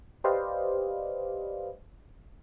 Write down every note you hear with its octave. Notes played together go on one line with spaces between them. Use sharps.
G4 B4 C5 D5 D#5 F5